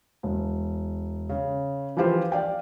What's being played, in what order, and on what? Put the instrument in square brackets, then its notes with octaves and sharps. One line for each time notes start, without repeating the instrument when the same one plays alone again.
[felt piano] E1
C#3
E3 F3 E4 F4 G4 C5
D5 F5 G5